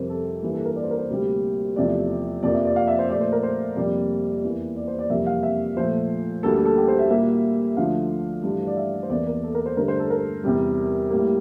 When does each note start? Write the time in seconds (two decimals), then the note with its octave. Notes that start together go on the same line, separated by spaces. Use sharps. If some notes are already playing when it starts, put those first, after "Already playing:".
Already playing: F2 C3 G3 A#4 C5
0.10 A4
0.43 G2 E3 A#3
0.54 A4
0.65 A#4
0.76 D5
0.84 C5
0.91 A#4
0.98 C5
1.10 D2 C3 G3 A#3
1.76 E2 C3 F3 A3 D5
2.43 F2 C3 F3 A#3 D5
2.54 E5
2.65 D5
2.76 F5
2.88 E5
2.99 C5
3.10 A#2 A3 D5
3.21 C5
3.32 A#4
3.43 C5
3.76 F2 C3 G3 A#3 D5
4.43 E2 E3 A#3
4.76 D5
4.88 C5
4.99 D5
5.10 F2 C3 E3 G3 A#3 E5
5.27 F5
5.43 E5
5.77 A#2 F3 A3 C5
6.43 D2 D3 G3 A#3 A4
6.54 A4
6.66 A4
6.76 G4
6.88 C5
6.99 E5
7.10 A#2 G3 A#3 E5
7.77 D2 D3 F3 A3 F5
8.44 G2 E3 A3
8.67 D5
8.77 E5
9.03 C5
9.10 E2 E3 A#3 D5
9.27 A#4
9.44 A4
9.55 A#4
9.66 C5
9.77 G2 D3 A3 A#4
9.88 C5
9.99 A4
10.10 A#4
10.44 E2 C3 G3
11.11 A2 G3 A#3